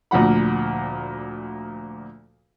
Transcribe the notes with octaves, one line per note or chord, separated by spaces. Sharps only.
D2 A#2 F3 F#5 B5